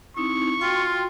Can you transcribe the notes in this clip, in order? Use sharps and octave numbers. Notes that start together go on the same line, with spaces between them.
C4 D#4 E4 C#6
F4 F#4 G5 C6